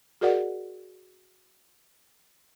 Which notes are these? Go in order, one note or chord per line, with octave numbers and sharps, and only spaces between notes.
F#4 G#4 A#4 D5 D#5 F#5